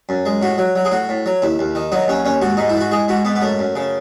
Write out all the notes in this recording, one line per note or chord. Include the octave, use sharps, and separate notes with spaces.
F#2
G#3
A2 F#4
F#3
F#3
G#4
A2 F#4
A2
F#3
D#2 E4
D#2
D#3
F#3 D#4
D#2 C#4
D#2 C#4
G#2 F#4
G#2 D#4
E4
E3 F#4
G#3 G#4
G#2 F#4
G#2 B3
B3
F#2 A3
F#2
C#3